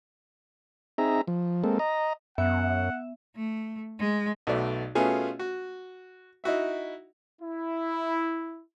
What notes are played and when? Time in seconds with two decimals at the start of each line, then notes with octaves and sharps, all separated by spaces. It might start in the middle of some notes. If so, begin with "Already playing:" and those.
0.98 C4 D#4 G#4 E5 A#5
1.28 F3
1.64 G#3 A#3 C4 A4
1.79 D#5 A#5
2.38 F#2 B3 E5 F#5
3.36 A3
3.99 G#3
4.47 B1 B2 A3 D5
4.95 B2 A3 B3 C#4 F4 G#4
5.39 F#4
6.44 D#4 E4 F#4 E5
7.41 E4